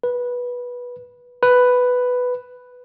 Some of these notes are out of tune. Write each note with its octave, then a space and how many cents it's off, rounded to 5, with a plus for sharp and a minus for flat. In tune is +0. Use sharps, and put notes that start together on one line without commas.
B4 -15
B4 +5